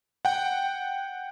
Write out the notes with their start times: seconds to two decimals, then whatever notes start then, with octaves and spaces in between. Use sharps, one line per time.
0.25 F#5 G5